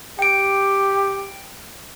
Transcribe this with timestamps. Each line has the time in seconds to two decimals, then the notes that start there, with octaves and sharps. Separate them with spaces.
0.19 G4 G5 D7